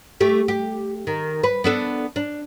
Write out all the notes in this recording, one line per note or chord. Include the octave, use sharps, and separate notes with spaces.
A3 G4
G4
D#3
B4
B3 D4 A4
D4